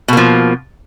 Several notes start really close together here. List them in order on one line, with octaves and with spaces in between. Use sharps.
B2 A#3 F3